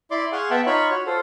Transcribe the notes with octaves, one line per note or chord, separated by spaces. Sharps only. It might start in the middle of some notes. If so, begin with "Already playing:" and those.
E4 D5 C6 D6
G#4 F5 F#5 G#5 C6 C#6
B3 E5 F#5 G5 A5
D#4 F4 C#5 B5 C#6
F#4 C#5
F4 A4 C5